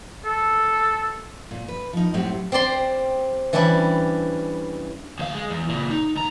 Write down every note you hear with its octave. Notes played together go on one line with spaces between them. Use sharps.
A4
A#2
B4
F3 D#4
A2 F#3 C4 G4 C5 F#5
C4 G4 D5 C6
E3 G3 C#4 D4 E4
D2 F5
G#3
E2
A#2 C#3
D#4
C#2 A#5